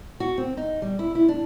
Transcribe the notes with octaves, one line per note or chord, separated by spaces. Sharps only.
F#4
C4
D#4
G3
E4
E4
D4